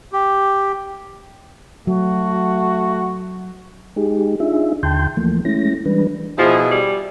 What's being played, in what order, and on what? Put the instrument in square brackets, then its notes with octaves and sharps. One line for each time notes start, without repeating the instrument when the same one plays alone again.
[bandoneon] G4
[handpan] F#3 [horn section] A3 F#4
[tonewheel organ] G#3 D#4 G4 G#4
D4 D#4 F4 G#4 E5
D#2 D3 G5 A5 C6 G6
E3 F3 A3 A#3
G#3 A3 C#4 E4 A#6
E3 G3 G#3 D4 B4
[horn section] B2 E4 G#4 [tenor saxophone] F3
[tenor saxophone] G3